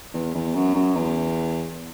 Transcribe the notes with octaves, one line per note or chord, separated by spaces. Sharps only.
E2
E2
F#2
F#2
E2